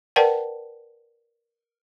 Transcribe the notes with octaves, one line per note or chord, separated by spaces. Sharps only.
A#4 B4 D5 F#5 G5 A5